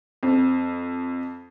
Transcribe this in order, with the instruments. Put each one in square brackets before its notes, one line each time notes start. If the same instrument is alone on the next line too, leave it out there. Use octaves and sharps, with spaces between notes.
[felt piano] F2